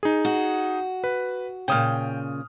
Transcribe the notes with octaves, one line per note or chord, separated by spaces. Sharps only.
D#4 G#4
F#4
B4
A#2 C#3 G5 D#6 F6